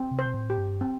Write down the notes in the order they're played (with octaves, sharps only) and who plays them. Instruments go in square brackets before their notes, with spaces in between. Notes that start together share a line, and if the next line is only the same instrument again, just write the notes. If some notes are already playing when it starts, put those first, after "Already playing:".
Already playing: [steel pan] C4
[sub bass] C3
[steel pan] C5
[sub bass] B2
A2
[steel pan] G4
[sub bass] G2
[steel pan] C4